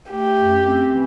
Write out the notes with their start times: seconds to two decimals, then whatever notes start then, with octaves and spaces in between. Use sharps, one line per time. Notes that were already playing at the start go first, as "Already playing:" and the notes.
0.10 A3 G4
0.37 F#2
0.63 C4
0.90 E3